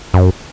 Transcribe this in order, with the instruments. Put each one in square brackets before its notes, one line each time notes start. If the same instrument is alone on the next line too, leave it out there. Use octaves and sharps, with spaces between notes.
[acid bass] F#2